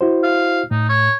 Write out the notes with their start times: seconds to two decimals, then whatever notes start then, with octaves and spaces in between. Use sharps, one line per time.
0.01 E4 F#4 C5
0.23 F5
0.71 A2 D#4
0.89 C#5